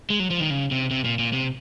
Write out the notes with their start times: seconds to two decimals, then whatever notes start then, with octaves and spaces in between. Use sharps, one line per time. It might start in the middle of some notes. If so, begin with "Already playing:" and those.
0.10 G#3
0.20 F#3
0.30 F3
0.40 D#3
0.50 C#3
0.71 C3
0.91 C3
1.04 A#2
1.19 A#2
1.33 C3